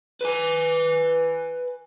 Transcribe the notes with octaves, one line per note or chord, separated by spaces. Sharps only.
B4 G#5